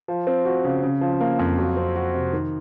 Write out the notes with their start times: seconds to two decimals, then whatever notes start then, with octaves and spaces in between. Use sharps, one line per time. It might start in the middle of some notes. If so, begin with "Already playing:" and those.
0.08 F3
0.27 C4
0.45 F#4
0.64 C#3
0.83 C#3
1.01 F3
1.20 A#3
1.39 F2
1.58 F#3
1.77 C4
1.96 F#4
2.14 C3
2.33 D#3